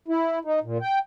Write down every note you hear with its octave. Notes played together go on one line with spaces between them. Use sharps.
E4
D#4
A#2
G5